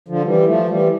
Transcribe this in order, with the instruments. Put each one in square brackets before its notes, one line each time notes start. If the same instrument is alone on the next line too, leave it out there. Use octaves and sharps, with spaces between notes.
[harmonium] D3 F3
E3 G3
F3 A3
E3 G3